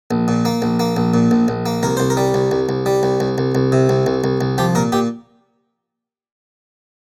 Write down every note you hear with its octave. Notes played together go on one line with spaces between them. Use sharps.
A#1
A#2
A#3
A#1
A#3
A#1
A#2
A#1
A#1
A#3
C2 A#4
C2 C5
A#4
G3
C2
C2
C2
G3
C2
C2
C2
C2
C3
C2
C2
C2
C2
F3 G4
A#2 A#4
A#2 G4